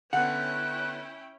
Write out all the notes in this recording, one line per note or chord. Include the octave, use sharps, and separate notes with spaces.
D3 B3 C#4 E4 F#5 G5 F#6